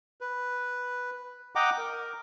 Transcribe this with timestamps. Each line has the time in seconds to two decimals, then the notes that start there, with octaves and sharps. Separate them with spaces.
0.21 B4
1.55 D#5 F#5 G5 A#5 D6
1.78 A#4